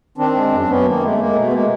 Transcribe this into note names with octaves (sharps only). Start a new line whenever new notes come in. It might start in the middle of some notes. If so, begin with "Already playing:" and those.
D#3 C4 D4
G#3
F#2
C4
F#2 B3 C#4
D#3 A#3
G#3 A3
G#3 A#3
B2 A3
B3
G#3 A#3